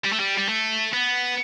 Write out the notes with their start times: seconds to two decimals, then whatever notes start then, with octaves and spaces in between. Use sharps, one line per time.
0.04 G3
0.13 A3
0.20 G3
0.38 G3
0.49 A3
0.93 B3